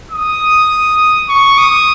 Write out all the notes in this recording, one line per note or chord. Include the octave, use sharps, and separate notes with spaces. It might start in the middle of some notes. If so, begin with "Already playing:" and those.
D#6
C#6
D#6